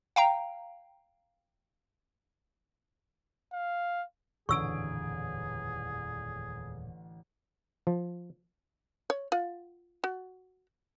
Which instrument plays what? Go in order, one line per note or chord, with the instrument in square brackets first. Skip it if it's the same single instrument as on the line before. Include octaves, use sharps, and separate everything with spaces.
[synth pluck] F5 G5 A#5
[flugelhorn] F5
[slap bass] D#1 F2 [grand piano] A1 D3 D7 [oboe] G#4 [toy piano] C#6 E6
[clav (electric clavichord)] F3
[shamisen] C#5
F4 F#5
F#4